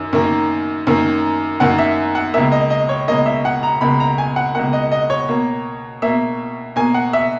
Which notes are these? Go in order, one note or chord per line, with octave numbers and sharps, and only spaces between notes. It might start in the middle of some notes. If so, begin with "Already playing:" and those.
Already playing: F#2 D#3
F#2 D#3 A#3
F#2 D#3 A#3
F#2 D#3 A#3 F#5
E5
F#5
C#2 B2 A#3 E5
D#5
D#5
C#5
C#2 B2 A#3 D#5
E5
F#5
A#5
C#2 B2 A#3 B5
A#5
G#5
F#5
C#2 B2 A#3 F#5
D#5
D#5
C#5
B2 A#3
B2 A#3 E5
B2 A#3 G#5
F#5
E5